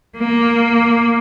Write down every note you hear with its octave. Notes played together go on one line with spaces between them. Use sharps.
A#3